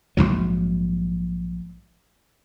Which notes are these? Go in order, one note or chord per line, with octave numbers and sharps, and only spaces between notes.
A#1 E2 G#2 F#3